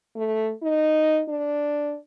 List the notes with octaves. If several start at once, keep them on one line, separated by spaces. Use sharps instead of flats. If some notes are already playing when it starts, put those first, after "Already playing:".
A3
D#4
D4